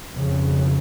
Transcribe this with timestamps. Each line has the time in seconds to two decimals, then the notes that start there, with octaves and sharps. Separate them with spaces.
0.14 F2 C#3